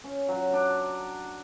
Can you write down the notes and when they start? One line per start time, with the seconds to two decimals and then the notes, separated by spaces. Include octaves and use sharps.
0.04 C#4
0.28 F#3
0.53 D4